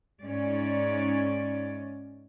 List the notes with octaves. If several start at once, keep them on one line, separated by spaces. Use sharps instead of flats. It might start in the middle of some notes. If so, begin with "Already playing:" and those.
G#2 C#4 D5